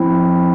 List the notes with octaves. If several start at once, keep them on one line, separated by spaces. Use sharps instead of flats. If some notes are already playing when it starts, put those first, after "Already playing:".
Already playing: F3 C4 E4